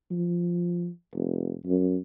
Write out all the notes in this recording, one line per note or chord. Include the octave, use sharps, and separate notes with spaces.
F3
F1
F#2